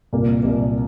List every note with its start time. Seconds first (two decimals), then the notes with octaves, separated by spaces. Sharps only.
0.12 C2 A#2 A#3
0.43 C2 A#2 A#3